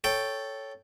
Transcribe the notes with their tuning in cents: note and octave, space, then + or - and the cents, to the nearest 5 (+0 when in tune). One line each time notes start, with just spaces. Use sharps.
A4 +0 C#5 +0 G5 +0